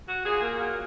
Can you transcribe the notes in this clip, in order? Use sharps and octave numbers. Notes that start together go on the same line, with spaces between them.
F#4
A#2 G#4
A#3
F#3 A#3